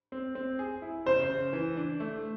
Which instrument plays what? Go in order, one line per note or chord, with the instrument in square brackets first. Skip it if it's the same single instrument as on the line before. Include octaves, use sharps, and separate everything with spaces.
[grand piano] C4
C4
G#4
E4
[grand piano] C#3 [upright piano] C5
[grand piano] C#3
E3
D4
A3